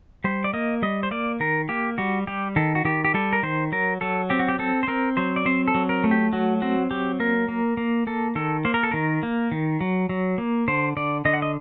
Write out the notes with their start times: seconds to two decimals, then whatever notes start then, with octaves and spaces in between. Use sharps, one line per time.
0.24 G3 C5
0.44 D5
0.53 A#3 D#5
0.82 G3 D#5
1.03 C5
1.11 A#3 D5
1.40 D#3 A#4
1.69 A#3 G4
1.98 G3 F#4
2.27 G3 G4
2.56 D#3 A4
2.75 F#4
2.85 D#3 G4
3.05 G4
3.14 G3 A4
3.33 A#4
3.43 D#3 C5
3.72 F#3 A#4
4.01 F#3 A4
4.30 C4 G4
4.39 F#4
4.49 G4
4.59 C4 A4
4.83 C5
4.88 C4 A#4
5.17 F#3 C5
5.36 D5
5.45 C4 C5
5.68 A4
5.75 F#3
5.89 A#4
6.04 A3
6.11 G4
6.33 F#3 F#4
6.62 C4 F#4
6.91 F#3 G4
7.20 A#3 A#4
7.48 A#3
7.77 A#3
8.07 A#3 A4
8.35 D#3 A4
8.65 A#3 C5
8.74 A#4
8.83 A4
8.91 D#3 A#4
9.23 A#3
9.51 D#3
9.81 F#3
10.09 F#3
10.38 A#3
10.68 D3 C5
10.97 D3 D5
11.25 D3 D#5
11.33 F#5
11.42 D#5